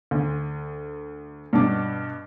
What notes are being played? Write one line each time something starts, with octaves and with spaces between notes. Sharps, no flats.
D2
G2 B2 D4 D6